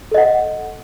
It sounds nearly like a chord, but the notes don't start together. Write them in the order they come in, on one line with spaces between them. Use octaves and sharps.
A4 D#5 F#5